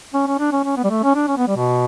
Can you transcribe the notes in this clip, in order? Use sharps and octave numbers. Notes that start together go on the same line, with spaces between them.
C#4
C#4
D4
C#4
C#4
B3
G3
A3
C#4
D4
C#4
B3
G3
B2